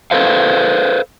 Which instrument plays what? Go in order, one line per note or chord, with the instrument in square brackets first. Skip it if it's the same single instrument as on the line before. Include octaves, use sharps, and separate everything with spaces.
[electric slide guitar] A4 B4 C5 F5